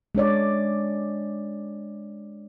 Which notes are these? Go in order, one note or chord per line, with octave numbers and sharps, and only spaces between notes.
G#3 D4 C#5 D5